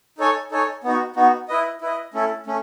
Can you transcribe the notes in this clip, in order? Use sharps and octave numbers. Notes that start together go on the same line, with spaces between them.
D#4 A4 C#5 G#5
D#4 A4 C#5 G#5
B3 D#4 F#4
B3 D#4 F#4
E4 B4 D#5
E4 B4 D#5
A3 C#4 E4 A4
A3 C#4